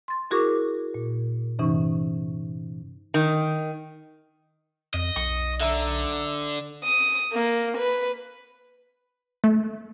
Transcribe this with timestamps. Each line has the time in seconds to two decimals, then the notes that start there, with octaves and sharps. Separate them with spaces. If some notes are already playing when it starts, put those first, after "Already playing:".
0.08 C6 A6
0.31 E4 F#4 G#4 A#4 C#6 D6
0.94 A#2
1.59 G2 C3 E3 C#4 D#4 C#6
3.14 D#3
4.94 F2 D#5
5.16 B1 C#6
5.60 D3 E5 A#5
6.84 D#6
7.32 A#3
7.77 B4
9.44 A3